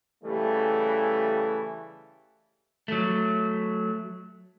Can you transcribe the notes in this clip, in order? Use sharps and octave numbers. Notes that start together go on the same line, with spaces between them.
C#3 E3 G3 A3
F#3 A3